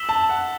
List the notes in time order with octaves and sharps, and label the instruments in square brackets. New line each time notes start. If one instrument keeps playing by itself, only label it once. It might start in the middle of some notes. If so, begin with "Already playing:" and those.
Already playing: [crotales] E6 B6 E7 G7
[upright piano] A5
F#5